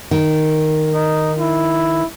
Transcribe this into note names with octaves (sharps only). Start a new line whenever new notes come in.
D#3
D#4
E4